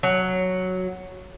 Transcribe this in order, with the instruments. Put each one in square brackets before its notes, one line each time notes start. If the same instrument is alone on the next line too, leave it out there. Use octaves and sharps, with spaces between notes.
[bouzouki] F#3